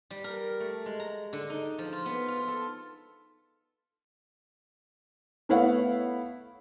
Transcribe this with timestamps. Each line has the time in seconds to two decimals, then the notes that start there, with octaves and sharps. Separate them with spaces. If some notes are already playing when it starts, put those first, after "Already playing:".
0.11 G3
0.24 A#4
0.60 A3
0.86 G#3
1.00 A#5
1.33 D3
1.50 D#4
1.78 F3
1.93 F4
2.06 B3
2.28 F4
2.48 A4
5.49 A3 B3 E4 C#5 F5 F#5